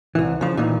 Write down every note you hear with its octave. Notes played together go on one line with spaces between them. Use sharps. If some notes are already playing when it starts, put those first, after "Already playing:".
C2 E3
C#3 F3
A#2 D#3 E3